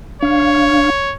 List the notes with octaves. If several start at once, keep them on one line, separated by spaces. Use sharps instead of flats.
D4 C#5 F5